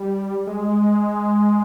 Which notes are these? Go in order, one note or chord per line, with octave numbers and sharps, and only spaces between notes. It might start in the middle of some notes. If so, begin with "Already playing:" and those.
Already playing: G3
G#3